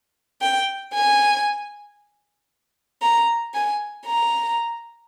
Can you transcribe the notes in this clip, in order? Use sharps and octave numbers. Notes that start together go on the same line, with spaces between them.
G5
G#5
A#5
G#5
A#5